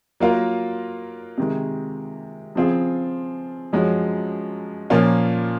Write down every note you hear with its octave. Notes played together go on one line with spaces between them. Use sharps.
F#3 A#3 F4 A#4
C3 D#3 G#3
C#3 F3 C4 F4 G#4
F#2 F3 G#3 C#4 F#4
A#2 F3 A#3 C#4 F4